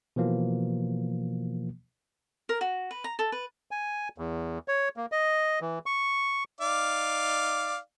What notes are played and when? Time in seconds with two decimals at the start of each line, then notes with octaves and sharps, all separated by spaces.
0.16 B2 E3 F3 A#3
2.49 A#4
2.61 F#4
2.91 B4
3.04 A#5
3.19 A4
3.32 B4
3.71 G#5
4.18 E2
4.68 C#5
4.97 A#3
5.12 D#5
5.61 E3
5.86 C#6
6.61 D#4 D5 F5